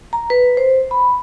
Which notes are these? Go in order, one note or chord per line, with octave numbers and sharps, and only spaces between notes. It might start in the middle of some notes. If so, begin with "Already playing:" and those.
A#5
B4
C5
B5